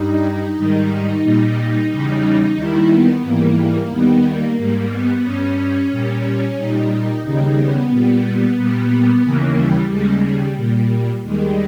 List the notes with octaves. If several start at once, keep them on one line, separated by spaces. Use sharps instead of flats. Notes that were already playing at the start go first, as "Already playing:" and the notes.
Already playing: G2 G3 D#4
G#2 D#3 G3
A#2 G3
E2 C#3 G3 D#4
D#2 D#3 G3 E4
B3
G#2 E3 G3 A#3
A#3
D#2 D#3 G3 B3
A#3
G#2 G3 A#3
B3
G2 G3 C#4
A#2 G3
A#2 G3 D#4
D#4
D#2 C#3 G3 D#4
B3
A#2 G3
A#2 G3
D#2 C#3 E3 A#3
G3
D#2 C#3 G3 G#3
G3
A#2 G3
D#2 D#3 G3 G#3